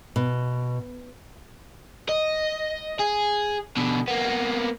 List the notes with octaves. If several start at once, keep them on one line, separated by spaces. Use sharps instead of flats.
B2
D#5
G#4
B2 D3
A#3 B3